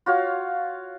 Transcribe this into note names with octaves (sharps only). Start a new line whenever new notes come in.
F4 F#4 C#5 F5